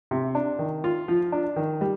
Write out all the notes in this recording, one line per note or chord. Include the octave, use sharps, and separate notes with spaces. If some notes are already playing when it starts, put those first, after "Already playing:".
C3
D4
D#3
F4
F3
D4
D#3
G3